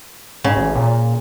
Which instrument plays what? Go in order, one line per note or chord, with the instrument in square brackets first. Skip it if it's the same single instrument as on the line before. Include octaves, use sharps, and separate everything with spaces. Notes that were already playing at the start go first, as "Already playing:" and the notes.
[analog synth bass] G#2 [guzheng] C#3
[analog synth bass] A1
A#2